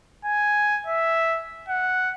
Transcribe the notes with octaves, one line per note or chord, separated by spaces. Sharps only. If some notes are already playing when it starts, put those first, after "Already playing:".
G#5
E5
F#5